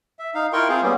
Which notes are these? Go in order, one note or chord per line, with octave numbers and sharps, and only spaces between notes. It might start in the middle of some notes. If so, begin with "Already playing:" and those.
E5
D#4 F5
E4 F4 A#4 G5 C6 C#6
C4 F4 G#4 C5 F5
G3 A#3 B3 C#4